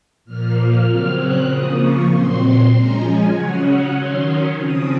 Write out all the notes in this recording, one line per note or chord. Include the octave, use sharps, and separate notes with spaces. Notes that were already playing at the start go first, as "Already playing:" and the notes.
A#2 F3 A#3 F6
F6
C#3 F#3 C4
F#6
C#3 F3 A#3 D#6
C#6
A#2 F#3 C4 C6
C6
F3 G#3 C#4 A#5
G#5
C#3 F#3 C#4 F#5
F#5
D#3 F#3 C#4 C6
C#3 F3 C4 D#6